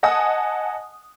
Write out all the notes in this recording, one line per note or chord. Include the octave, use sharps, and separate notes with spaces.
D#5 F#5 G#5 A5 D#6